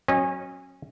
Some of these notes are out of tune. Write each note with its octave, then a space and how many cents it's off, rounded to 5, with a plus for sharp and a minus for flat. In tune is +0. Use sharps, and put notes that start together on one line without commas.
F#3 +0 C#4 -30 D#5 -10